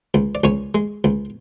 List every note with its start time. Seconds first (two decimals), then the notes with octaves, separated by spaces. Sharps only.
0.14 C#2
0.35 D5
0.44 C#2 C#4 C#5
0.75 G#3
1.04 C#2